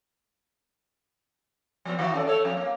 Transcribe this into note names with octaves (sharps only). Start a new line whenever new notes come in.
F3 A3 B3
D#3 E3 F#4
C#4 A4 D5
A3 A4 C#5
F2
A#3